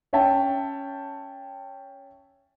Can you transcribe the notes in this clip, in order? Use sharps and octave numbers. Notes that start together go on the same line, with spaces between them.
C#4 C#5 E5 G5 A5